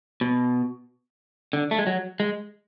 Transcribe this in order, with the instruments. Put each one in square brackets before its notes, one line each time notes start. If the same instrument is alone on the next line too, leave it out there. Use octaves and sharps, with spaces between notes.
[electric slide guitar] B2
D3
A3
G#3
F#3
G#3